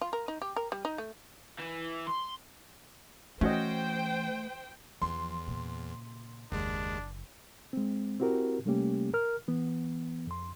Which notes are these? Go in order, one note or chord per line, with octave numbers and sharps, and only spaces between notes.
F4
A#4
D#4
G4
A#4
G3
D#4
A3
E3
C6
E3 A3 C#4 F#4 C5 D#5 G5
E2 F3 C6
A#2 C#3
F#1 D#2 G#3 D4
G#3 C4
C4 E4 F#4 G4 A#4
C3 G3 A3 A#3 C#4 G4
A#4 F6
E3 B3
F2 C6